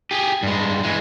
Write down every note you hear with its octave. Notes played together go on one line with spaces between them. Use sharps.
G4 G#4
G2 G#3
E3 G#3